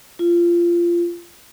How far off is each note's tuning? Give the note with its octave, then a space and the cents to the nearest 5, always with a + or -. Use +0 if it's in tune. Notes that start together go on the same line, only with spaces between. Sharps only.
F4 -20